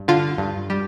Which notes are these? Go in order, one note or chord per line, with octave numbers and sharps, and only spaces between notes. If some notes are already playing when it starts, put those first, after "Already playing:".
Already playing: G2
D3 F4
G2
G3